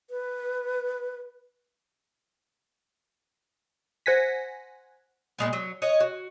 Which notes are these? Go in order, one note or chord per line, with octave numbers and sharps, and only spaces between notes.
B4
C5 F#5 G#5 A#6 B6
A#2 G#3 B3
F#3
C#5 D#5 F#5
F#4